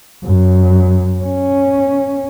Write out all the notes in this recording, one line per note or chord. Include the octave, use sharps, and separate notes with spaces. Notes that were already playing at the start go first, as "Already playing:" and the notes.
F#2
C#4